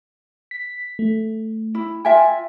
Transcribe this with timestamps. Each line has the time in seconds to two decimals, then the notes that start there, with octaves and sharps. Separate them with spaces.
0.51 B6
0.99 A3
1.75 E4
2.05 F4 E5 G5 G#5